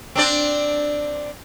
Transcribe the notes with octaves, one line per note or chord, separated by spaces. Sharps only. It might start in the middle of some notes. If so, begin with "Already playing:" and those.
C4 D4 D5